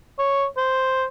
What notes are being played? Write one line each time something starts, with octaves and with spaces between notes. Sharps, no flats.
C#5
C5